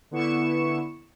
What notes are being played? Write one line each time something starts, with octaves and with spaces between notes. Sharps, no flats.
D3 B3 E4 C#6 C#7 E7